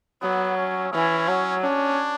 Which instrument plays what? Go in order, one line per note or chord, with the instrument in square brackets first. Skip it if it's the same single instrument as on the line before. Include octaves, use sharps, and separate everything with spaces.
[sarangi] F#3 [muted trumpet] B3
[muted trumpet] C#4
[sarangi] E3 [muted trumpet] C#4
[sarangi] F#3
[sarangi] C#4 [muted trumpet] D4